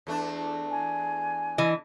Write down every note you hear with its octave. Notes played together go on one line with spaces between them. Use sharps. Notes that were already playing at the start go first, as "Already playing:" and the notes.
E2 A3 D4
G#5
E3 D#5